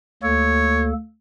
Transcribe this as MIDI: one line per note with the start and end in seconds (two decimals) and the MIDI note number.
0.23 0.93 38
0.23 0.93 58
0.23 0.93 69
0.23 0.87 73